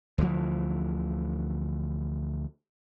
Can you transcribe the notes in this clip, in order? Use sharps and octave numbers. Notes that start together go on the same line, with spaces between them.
D2 D3 E3 F3